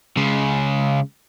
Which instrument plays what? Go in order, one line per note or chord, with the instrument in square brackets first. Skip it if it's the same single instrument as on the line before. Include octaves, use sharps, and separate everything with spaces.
[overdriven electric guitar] C#3 G#3